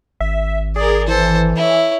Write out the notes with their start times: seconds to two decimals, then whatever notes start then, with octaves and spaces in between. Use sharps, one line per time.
0.20 G#1 E5
0.76 G#4 A#4 D5
1.08 E3 A4 C5
1.56 E4 C#5